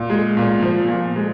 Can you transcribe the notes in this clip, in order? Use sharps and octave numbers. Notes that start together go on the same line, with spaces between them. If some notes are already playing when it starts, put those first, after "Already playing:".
Already playing: A#2
G#3
A#2
F3
A#2
G#3